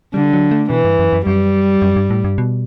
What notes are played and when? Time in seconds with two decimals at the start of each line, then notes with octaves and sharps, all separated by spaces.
0.14 D3 G3
0.33 F#3
0.51 A3
0.70 B2 E3
0.85 G2
0.99 F#2
1.13 F#2
1.26 F#2 G3
1.82 F#2
1.96 G2
2.10 A2
2.24 G2
2.38 B2